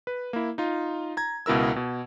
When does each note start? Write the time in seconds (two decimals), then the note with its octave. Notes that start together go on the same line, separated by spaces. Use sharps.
0.07 B4
0.33 A#3 E4
0.58 D#4 F4
1.17 A#5 G#6
1.46 C#2 B2 E4 A#4 E6
1.76 B2